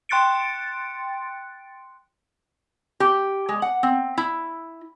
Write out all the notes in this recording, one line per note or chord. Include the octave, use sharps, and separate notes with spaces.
G5 C6 F#6 A6 C#7 D7
G4
G#3
F#5
C4
E4